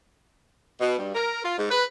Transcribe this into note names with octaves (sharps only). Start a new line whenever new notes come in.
B2
G2
A#4
F4
G#2
B4